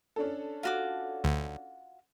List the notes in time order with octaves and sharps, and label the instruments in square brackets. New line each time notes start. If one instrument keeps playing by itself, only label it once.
[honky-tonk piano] C#4 D4 A4
[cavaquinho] F4 F#4 D6
[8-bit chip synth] D2